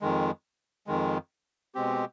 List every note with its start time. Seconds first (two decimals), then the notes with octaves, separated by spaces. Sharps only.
0.01 F2 D#3 G#3
0.87 F2 D#3 G#3
1.75 B2 G#3 C4 G4